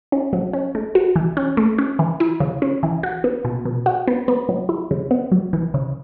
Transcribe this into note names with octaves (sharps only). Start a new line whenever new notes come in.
C#4
F#3
C#4
A3
F#4
E3
C#4
A3
C#4
E3
E4
C#3
C#4
E3
F#4
B3
B2
B2
F#4
B3
B3
F#3
E4
C#3
B3
F#3
E3
C#3